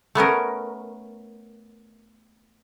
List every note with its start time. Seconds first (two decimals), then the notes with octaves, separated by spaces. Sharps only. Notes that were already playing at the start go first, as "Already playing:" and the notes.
0.15 A3 B3 C#4 A#4